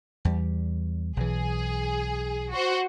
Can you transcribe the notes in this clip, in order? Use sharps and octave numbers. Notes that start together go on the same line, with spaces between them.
E2 G3
B1 E3 G#4
F#4 C5